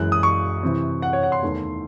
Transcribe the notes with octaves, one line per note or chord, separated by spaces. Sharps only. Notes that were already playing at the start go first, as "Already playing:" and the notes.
Already playing: F#2 E3 G#3 F#6
D#6
C#6
C3 E3 C4
F#5
C#5
F#5
C6
E2 D#3 A3